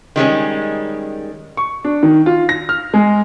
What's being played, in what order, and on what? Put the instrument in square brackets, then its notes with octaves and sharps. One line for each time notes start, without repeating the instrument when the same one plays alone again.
[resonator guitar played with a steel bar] D#3 G3 G#3 C#4
[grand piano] C#6
D4
D#3
F4
A#6
F6
G#3